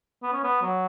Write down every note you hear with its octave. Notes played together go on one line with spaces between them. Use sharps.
B3
C#4
B3
F#3